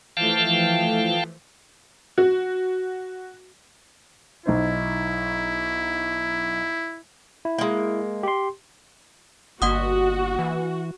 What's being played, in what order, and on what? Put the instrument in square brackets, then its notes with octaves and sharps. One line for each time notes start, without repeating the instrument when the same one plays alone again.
[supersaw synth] E3 F3 A3 [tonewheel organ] F5 G5 A5
[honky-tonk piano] F#4
[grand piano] B1 D#4 C5 [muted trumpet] E4
[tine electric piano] E4
[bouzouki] G#3 A#3
[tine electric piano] G4 C6
[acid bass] G1 [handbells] A#3 F#5 D#6 [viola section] F#4
[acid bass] E3